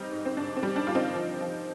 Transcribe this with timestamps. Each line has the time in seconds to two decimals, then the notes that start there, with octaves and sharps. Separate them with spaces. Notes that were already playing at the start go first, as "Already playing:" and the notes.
Already playing: G3 C4 D#4
0.11 G#2
0.25 C4
0.37 G#2 D4
0.56 C4
0.63 G3
0.76 D4
0.87 G3 F4
0.95 C4 D#4
1.14 F3
1.41 F3